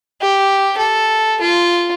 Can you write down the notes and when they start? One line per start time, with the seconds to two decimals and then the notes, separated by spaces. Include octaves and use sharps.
0.21 G4
0.77 A4
1.41 F4